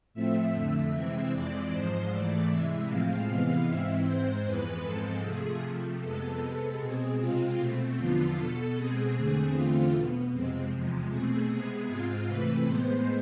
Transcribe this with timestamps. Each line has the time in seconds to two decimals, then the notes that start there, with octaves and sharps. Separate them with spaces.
0.14 A2 F3 A3 C4 E5
0.53 F2 D3 A3 E5
0.92 C3 E3 G#3 C4 E5
1.31 F2 E3 G#3 C4 D5
1.71 G#2 F3 G#3 C5
2.10 G#2 E3 A3 D5
2.49 C3 E3 G#3 E5
2.88 A2 F3 G#3 C4 F5
3.27 C3 E3 G#3 B3
3.66 G#2 E3 G#3 C4 E5
4.05 G#2 G#3 C4 C5
4.45 F2 E3 G#3 B3 B4
4.83 G#2 F3 G#3 C4 A4
5.23 C3 F3 A3 G#4
5.62 C3 F3 A3
6.01 F2 C3 G#3 B3 A4
6.40 C3 G#3 B3 A4
6.79 B2 G#3 C4 G#4
7.18 C3 G#3 C4 F4
7.58 B2 A3 C4
7.97 E2 D3 F3 B3 F4
8.36 B2 B3 A4
8.75 B2 G#3 C4 G#4
9.14 E2 D3 A3 C4
9.53 E2 D3 A3 C4 F4
9.92 B2 B3
10.32 F2 C3 G#3 C4
10.71 E2 C3 F3 G#3
11.10 B2 A3 C4 G#4
11.49 C3 G#3 B3
11.88 G#2 G#3 C4 F4
12.27 C3 E3 A3 C4 B4
12.66 A2 G#3 B3 C5